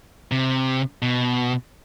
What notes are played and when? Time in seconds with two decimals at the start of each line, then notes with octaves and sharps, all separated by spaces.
0.32 C3
1.02 B2